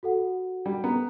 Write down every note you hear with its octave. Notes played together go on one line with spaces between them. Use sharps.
F#4 A4 F#5
G3
B3 A#5